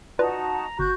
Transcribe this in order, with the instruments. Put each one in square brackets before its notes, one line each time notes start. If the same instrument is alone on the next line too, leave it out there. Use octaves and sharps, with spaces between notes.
[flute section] D#4 F#4 A5 [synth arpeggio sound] F4 B4 D5 [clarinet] A#5
[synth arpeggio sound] G1 [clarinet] F#4 [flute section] F#6 G6